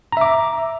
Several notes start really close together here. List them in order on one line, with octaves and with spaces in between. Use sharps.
A#5 E5 D6